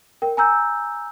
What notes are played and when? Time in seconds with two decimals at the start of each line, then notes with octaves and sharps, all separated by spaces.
0.22 A#4 G5
0.37 G#5 A#5 E6 G6